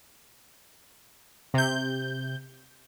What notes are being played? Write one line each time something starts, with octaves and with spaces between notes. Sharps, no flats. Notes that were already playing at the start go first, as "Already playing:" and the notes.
C3 G6